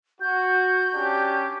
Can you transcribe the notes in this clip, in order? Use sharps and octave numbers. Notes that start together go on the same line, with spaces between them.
F#4 G6
C#4 D4 G4